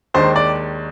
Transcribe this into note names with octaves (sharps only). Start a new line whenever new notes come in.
D#2 D#3 G#3 D4 C5
D5